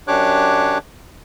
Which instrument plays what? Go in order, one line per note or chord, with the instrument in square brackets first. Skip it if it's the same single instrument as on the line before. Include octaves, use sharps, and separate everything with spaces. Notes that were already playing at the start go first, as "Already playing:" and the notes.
[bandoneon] F#2 D4 G4 C#5 D6 F#6